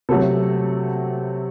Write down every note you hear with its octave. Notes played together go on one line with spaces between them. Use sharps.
C3 F#3 A3 A4